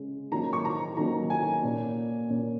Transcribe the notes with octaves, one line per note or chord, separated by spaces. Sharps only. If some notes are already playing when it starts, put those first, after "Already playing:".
Already playing: C#3 G#3 C#4
D#3 F#3 A#3 C#4 A#5
C#6
A#5
D#3 F#3 A#3 C#4 A#5
G#5
A#2 A#3 C#4
A#2 A#3 C#4